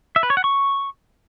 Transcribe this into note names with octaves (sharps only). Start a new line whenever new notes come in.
E5
B4
C#5
F#5
C#6